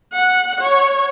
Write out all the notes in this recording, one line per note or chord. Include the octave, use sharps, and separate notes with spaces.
F#5
C#5